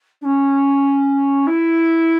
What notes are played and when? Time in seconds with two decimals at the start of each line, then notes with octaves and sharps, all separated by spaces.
0.22 D4
0.25 C#4
1.47 E4